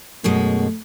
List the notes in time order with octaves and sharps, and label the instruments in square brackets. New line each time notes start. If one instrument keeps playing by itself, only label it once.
[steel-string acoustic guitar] F#2 B2 G#3 [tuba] A3